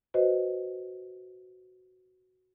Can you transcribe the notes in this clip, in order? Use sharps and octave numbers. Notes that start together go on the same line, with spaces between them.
F#4 B4 C5 D#5